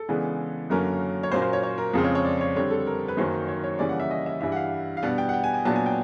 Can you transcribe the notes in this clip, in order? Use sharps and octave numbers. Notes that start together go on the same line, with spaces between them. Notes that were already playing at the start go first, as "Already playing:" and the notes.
Already playing: A4
C#3 E3 G#3 B3 D4
F#2 D3 F#3 A#3 C#4 A#4
C#5
A#2 F#3 A#3 C#4 C5
C5
C#5
C#5
A#4
F2 C#3 F3 G#3 C4
C#5
C#5
D5
C#5
D3 G3 C4 C#5
A4
A#4
B4
F#2 D#3 F#3 A#3 C#4 C5
C#5
C#5
C#3 E3 G3 A#3 C#4 D5
F#5
E5
D#5
E5
G2 E3 G3 E5
F#5
F5
F5
B2 G3 B3 D4 F#5
G5
F#5
G5
G#5
G#5
A#2 F#3 B3 D4 A5
G#5
G5